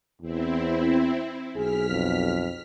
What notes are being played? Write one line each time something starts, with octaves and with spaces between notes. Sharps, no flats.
E2 C4 E4
B1 G#4 F6 B6
F2